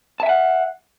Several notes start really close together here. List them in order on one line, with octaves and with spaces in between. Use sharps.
A5 E5 G#5 F#5